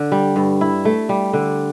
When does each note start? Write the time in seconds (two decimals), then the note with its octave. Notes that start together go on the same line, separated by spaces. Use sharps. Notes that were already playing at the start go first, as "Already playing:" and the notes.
Already playing: D3
0.12 G3
0.36 G2
0.61 E4
0.85 A3
1.09 G3
1.33 D3